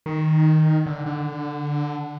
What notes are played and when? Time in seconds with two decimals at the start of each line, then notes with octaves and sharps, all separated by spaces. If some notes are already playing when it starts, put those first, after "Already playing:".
0.06 D#3
0.86 D3
1.06 D3